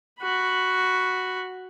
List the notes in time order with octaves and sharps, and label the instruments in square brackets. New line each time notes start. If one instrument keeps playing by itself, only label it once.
[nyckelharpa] F#4 B5